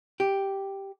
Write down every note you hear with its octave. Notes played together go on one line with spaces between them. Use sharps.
G4